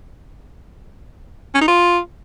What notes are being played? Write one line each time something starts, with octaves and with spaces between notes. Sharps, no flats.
C#4
D#4
F4